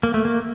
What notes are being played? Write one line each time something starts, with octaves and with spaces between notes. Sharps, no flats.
A#3
A3
A#3